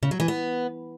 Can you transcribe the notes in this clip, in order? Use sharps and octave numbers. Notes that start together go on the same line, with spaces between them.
C#3
F#3
E3
B3